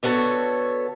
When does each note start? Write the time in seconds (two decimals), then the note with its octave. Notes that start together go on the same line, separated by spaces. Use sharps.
0.03 D3 B3 F#4 A4 C#5